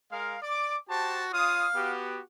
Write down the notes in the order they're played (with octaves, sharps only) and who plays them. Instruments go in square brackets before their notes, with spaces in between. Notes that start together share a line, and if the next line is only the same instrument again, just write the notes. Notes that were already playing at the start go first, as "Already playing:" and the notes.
[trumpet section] G#3 A#4 F5
[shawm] D5 [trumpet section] D6
[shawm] F#4 [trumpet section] G4 C5 A5
[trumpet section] F4 C#5 D#6 [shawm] F5
[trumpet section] B3 F#4 G4